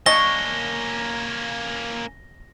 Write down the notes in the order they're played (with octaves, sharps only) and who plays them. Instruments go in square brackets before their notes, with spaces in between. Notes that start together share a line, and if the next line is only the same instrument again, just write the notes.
[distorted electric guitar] A#3 C#4 [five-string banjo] D4 D#5 A5 [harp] C#6 [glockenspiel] A#6 G7